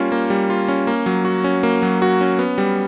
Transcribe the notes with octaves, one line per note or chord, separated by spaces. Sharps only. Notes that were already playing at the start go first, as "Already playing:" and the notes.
Already playing: G3 A#3 C#4 F4
A#3
G3
F4
C#4
A#3
F#3
F#4
C#4
A#3
F#3
F#4
C#4
B3
G3